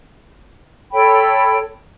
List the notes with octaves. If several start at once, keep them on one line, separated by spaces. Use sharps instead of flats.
A4 C#5 G5 B5